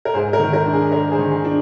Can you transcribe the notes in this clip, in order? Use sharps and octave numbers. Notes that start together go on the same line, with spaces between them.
A#4
G#2 G#4 C5
A#4
D#3
A#4
D4
G#4
G#3 A#4
G#4 C5
D#3
G#4
D4